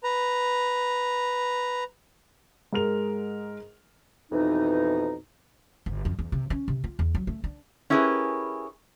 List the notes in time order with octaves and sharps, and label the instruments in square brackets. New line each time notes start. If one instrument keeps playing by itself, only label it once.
[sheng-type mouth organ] B4 A#5
[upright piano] G#2 G#3 A#4 F7
[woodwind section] F2 B2 E3 D#4
[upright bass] G1
F2
E2
C3
C#4
C3
F4
E2
F#3
A3
D4
[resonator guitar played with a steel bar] C#4 E4 G4 G#4 A#4 B4